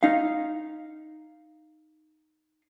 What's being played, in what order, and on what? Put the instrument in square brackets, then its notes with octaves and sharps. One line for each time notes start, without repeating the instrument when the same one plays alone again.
[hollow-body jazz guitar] D#4 F5